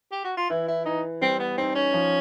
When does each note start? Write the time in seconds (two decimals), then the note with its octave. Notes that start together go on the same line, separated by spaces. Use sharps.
0.12 G4
0.24 F#4
0.37 F4
0.50 E3 E4
0.68 E4
0.85 E3 D#4
1.21 G3 C4
1.39 B3
1.58 C4 D#4
1.75 C#4
1.93 F3